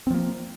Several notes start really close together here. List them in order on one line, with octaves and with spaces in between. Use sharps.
C4 F3 A#3